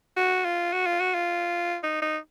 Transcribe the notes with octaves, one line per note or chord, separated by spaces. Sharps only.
F#4
F4
F#4
F4
F#4
F4
D#4
D#4